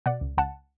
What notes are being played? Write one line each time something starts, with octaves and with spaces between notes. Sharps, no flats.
B2 D5 F#5
C#2
C#2 F#5 A5